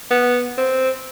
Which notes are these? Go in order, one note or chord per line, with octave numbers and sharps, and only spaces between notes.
B3
C4